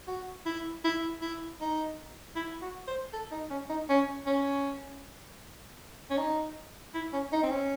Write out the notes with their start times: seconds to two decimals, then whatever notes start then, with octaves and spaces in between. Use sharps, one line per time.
0.08 F#4
0.46 E4
0.84 E4
1.21 E4
1.61 D#4
2.36 E4
2.62 F#4
2.87 C5
3.13 A4
3.31 D#4
3.50 C#4
3.69 D#4
3.89 C#4
4.26 C#4
6.10 C#4
6.17 D#4
6.94 E4
7.13 C#4
7.32 D#4
7.43 C4
7.51 C#4